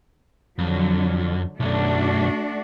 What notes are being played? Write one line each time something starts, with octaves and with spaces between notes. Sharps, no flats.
F2 D3 F#3
B1 F#2 A3 D4 F#4